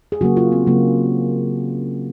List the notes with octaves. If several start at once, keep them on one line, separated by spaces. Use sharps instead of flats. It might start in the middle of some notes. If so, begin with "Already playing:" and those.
G#4
C#3 F#3 A#3 F#4
F4
C4
C#3 F#3 A#3